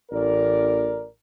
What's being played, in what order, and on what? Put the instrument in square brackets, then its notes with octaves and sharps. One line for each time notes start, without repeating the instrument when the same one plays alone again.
[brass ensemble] A1 A#4 D5